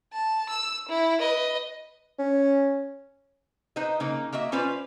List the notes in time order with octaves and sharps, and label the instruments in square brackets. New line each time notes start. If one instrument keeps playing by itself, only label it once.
[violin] A5
E6
E4
B4 D#5
[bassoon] C#4
[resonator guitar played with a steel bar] D#4 B4 C5 D#5
C#3 A#3 D#4
A#3 F#4 D#5 E5
C#4 F4 B4 C5 D5